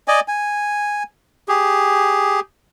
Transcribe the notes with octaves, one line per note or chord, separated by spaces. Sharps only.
D5 D#5 G#5
G#5
G4 G#4